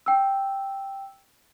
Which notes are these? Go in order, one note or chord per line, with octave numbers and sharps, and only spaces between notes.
G5 E6